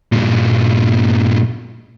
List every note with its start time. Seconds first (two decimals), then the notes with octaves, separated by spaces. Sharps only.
0.12 G2 A#2